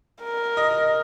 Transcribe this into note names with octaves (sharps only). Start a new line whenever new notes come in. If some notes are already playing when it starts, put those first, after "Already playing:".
A#4
D#5